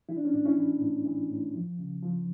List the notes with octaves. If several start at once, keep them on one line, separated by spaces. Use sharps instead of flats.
E3 E4
D4
C#4
A2 D4
C#4 E4
E3
A2
E3
A2
F3
C#3
F3